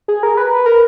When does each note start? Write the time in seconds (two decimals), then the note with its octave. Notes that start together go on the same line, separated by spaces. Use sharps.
0.08 G#4
0.23 A#4
0.37 B4
0.66 A#4